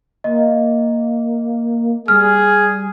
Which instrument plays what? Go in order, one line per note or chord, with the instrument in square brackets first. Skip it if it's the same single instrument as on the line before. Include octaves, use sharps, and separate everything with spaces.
[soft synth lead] A#3 [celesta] D#5
[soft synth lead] G3 [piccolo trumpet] G#4 [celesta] F6